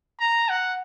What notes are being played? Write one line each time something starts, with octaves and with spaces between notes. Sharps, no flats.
A#5
F#5